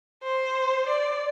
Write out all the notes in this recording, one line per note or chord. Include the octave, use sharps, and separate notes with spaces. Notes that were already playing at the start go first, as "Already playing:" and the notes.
C5
D5